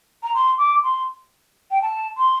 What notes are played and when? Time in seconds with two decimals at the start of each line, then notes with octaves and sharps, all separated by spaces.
0.23 A#5
0.35 C6
0.58 D6
0.83 C6
1.71 G5
1.82 A5
2.18 C6